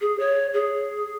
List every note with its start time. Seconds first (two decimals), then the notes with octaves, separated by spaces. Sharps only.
0.01 G#4
0.20 C#5
0.54 G#4